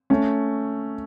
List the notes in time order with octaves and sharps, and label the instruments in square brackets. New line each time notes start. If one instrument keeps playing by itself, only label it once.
[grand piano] A3 C#4